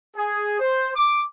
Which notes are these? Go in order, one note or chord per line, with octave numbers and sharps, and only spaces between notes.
G#4
C5
D6